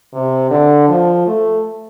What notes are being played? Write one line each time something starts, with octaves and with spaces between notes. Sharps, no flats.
C3
D3
F3
A3